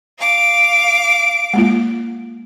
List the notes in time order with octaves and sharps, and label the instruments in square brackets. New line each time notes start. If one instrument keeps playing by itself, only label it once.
[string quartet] F5 D6
[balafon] G#3 A#3 F4